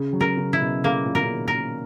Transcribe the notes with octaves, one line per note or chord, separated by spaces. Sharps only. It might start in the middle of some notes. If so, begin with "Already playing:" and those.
Already playing: C#3
F#3
A#4
C#3
E4
B2
C#3 A#3
A#2
B2 A#4
C#3
D#3
A#4